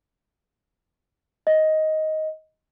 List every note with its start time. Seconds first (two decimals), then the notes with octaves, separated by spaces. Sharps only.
1.47 D#5